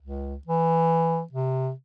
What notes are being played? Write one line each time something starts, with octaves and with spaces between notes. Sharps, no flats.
C#2
E3
C3